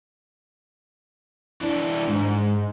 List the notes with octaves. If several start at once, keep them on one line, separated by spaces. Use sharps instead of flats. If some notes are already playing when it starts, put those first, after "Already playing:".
E3 D4
G#2